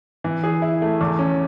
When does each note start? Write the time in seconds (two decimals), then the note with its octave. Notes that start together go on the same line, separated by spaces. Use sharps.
0.24 E3
0.43 G#4
0.62 E4
0.82 A3
1.01 E2
1.19 C#4